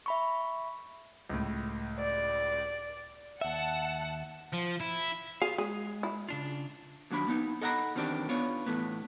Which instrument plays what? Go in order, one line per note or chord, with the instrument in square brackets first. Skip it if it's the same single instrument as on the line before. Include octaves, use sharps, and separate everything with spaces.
[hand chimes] E5 B5 C#6
[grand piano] C#2 A2
[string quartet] D5
[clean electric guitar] D#2 E5 [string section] F#5 A5
[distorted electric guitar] F3
E4
[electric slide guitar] F4 F5 [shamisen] G#4
[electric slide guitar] G#3 [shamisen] G#4
[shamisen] E4
[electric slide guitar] C#3 D4 F4
[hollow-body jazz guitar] D#2 F#3 D4 B5
A#3 B3 D#4
A4 D#5 F#5 G#5 A#5 B5
E2 D#3 C4 D4 G4
B3 D4 F4 C#5
A2 E3 A3 B3